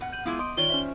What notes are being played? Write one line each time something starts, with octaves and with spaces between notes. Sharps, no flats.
B2 F#5
G6 D#7 F#7
G#3 B3 E4 F4 D6
D#5 C6 D7
D#3 F4 C#5 D5 G7
C#4 C5 E5